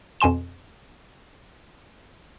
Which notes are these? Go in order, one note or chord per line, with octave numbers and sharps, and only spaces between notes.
F2 B2 G#5 C6 E7